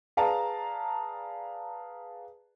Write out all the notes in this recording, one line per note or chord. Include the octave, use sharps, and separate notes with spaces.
G#4 B4 D5 F5 A5 A#5